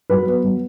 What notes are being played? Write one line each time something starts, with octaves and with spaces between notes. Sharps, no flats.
F#3 B4
B3
F#3